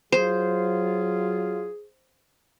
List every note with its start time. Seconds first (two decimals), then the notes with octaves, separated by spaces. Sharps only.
0.12 F#3 F4 G#4 C5